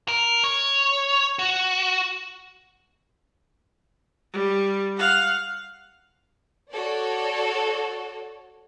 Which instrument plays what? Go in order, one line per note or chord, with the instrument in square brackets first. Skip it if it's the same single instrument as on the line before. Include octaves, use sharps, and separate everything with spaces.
[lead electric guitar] A#4
C#5
F#4
[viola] G3
F5 F#5
[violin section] F#4 A4 C#5 D5